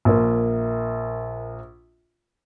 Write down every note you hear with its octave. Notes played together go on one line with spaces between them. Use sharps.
A#1 A#3